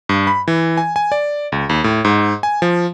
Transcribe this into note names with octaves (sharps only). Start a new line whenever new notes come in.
G2
B5
E3
G#5
G#5
D5
C#2
D#2
A2
G#2
G#5
F3